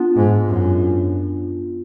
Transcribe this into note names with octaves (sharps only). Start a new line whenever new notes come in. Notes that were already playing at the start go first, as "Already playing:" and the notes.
Already playing: B3 D4 F4
G#2
F#2